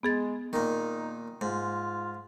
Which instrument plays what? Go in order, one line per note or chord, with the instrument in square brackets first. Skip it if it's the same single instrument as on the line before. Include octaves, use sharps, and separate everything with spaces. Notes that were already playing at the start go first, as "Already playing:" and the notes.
[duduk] G#3 [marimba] B3 G#4 A6
[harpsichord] A#2 D#3 [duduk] D#4
[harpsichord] G#2 [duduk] F4